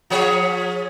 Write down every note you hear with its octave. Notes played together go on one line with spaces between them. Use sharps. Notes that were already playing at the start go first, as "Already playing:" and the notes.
F3 G#4 C#5